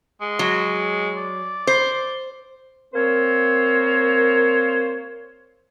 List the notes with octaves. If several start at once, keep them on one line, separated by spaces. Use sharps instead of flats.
G#3
F#3
D5
C5
A#3 C4 A#4 C5 C#5